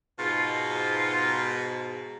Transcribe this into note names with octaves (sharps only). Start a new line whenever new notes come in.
G#2 B2 F4